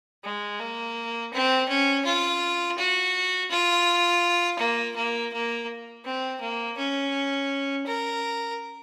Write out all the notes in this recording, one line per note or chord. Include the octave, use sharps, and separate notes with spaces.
G#3
A#3
C4
C#4
F4
F#4
F4
A#3
A#3
A#3
C4
A#3
C#4
A#4